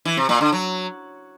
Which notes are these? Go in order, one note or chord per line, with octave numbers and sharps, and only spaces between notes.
E3
C3
A#2
D3
F#3